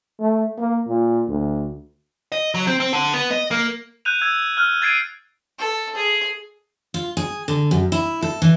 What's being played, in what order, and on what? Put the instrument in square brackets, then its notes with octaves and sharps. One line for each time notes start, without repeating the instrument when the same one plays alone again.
[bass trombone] A3
A#3
A#2
D2
[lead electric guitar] D#5
F#3
C4
C4
D3
B3
D#5
A#3
[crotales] F#6 G6 D#7 F7
E6 G#6
F6 F#6
G#6 A6 C7 D7 D#7
[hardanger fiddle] A4
G#4
[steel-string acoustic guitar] F4
G#4
D3
F#2
E4
A4
E3